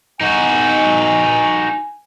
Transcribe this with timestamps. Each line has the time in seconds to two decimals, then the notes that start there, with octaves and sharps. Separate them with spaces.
0.21 D#4 F#4 G#5